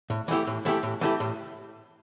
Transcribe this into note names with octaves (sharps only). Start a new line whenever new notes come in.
A2
E3 A3 E4 G4
A2
E3 A3 E4 G4
A2
E3 A3 E4 G4
A2